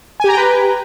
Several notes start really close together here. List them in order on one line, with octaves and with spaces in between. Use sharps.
G#5 G4 A#5 G5 B4